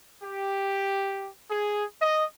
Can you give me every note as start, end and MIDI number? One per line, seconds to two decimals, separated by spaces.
0.23 1.29 67
1.50 1.84 68
2.02 2.25 75